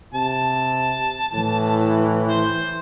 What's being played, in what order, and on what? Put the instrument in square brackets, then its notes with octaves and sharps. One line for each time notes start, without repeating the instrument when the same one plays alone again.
[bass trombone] C3 [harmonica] A5
[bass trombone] A2 [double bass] E3
[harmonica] C5